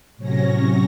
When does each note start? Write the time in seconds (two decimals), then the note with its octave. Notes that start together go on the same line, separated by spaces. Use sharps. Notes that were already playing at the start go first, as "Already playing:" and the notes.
0.17 A2 C3 F#3 C#4 C#5 A#6